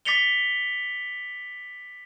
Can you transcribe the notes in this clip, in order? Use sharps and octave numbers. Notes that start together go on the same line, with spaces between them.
D6 A6 B6 C#7 F7 G7